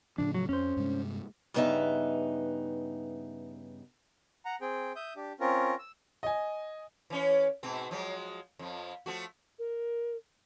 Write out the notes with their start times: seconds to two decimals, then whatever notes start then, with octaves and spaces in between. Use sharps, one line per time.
0.18 A2 C#3 F3 D4
0.34 F#3
0.49 F2 C#4 C5
0.77 G2 C3 G#3
1.54 G2 C#3 B3 D#4 E5
4.45 F#5 A#5
4.61 C4 G#4 G5
4.96 E5 D#6 G6
5.16 D4 G4
5.40 C4 C#4 F4 A#4
5.79 E6
6.23 D#5 G#5
7.10 E3 C#4 C#5
7.63 G#2 B2 C4
7.91 F3 F#3 G#3
8.59 F2 F3
9.06 F3 A3 F#4
9.59 A#4